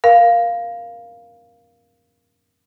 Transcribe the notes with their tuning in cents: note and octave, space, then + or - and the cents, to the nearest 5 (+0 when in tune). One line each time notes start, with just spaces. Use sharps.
A#4 +15 F5 +0